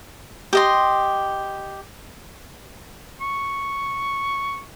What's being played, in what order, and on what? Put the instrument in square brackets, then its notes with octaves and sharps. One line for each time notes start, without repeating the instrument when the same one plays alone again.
[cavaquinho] G4 D#5 C6
[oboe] C#6